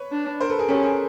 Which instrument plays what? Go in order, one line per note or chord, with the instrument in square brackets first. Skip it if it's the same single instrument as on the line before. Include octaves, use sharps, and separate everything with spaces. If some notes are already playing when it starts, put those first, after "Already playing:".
Already playing: [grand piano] B4 C#5
[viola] D4
[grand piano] A#4 C5
A4 B4
G#4 A#4
[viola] C#4 [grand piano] G4 A4
[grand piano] G#4 A#4